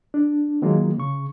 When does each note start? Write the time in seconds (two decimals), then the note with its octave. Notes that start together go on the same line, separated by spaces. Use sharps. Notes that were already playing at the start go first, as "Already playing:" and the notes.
0.14 D4
0.62 D#3 F#3 G#3 A#3 F4
0.98 C#3 C#6